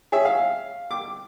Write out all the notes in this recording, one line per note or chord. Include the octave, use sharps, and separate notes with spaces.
G#4 C#5 E5
F5
D6